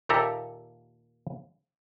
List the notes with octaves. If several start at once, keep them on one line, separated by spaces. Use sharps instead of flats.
D#2 A#2 G4 A4 E5 A#5